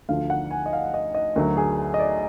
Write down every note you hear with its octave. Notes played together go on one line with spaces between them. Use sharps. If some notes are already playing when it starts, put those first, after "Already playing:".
D2 D3 F3 F5
F#5
G#5
D#5
F5
D#5
D#5
D2 D3 F#3 A#4
G#4
D#5
D5